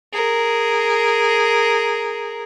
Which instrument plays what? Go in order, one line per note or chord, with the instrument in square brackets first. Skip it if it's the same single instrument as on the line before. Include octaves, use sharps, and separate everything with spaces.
[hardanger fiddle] G#4 A#4